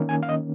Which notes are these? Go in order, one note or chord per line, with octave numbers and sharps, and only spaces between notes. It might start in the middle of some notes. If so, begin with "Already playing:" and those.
Already playing: D#3 A#3 C#4
G#5
F5
D#5